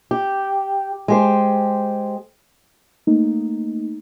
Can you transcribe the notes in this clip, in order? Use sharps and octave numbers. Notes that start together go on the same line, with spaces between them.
G4
G#3 G4 C5
A3 A#3 D#4